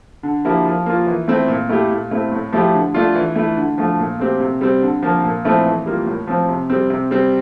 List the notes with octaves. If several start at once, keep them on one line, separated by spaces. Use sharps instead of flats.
D3
F3 A#3 E4 G4
F3
A#3 F4
E3
A3 C4 E4
A#2
A3 E4 G4
A#2
A3 C4 E4
A2
F3 A3 E4 G4
D3
A3 D4 F4
E3
A3 E4
D3
F3 A3
A#2
A3 C4 G4
C3
G3 C4
D3
F3 A#3
A#2
F3 A3 C4 E4
E3
G3 A#3 F4
A2
F3 C4
C3
G3 C4
C3
G3 C4